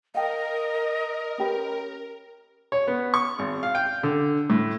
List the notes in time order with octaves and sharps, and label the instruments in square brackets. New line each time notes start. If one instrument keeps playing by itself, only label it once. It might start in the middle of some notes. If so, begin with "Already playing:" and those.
[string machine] A#4 [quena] D#5 [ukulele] F5 G5 A5
[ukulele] C#4 G4 B4
[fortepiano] C#5
B3
C#6
G#1
F5
G5
D3
A2